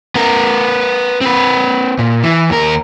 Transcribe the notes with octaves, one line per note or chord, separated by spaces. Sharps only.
B3 A#4
C4 B4
A#2
E3
D#2 A#4